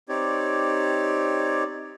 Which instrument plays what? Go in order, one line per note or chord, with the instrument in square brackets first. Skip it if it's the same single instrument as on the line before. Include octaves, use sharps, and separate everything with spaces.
[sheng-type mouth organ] C4 D#4 G4 C#5 D5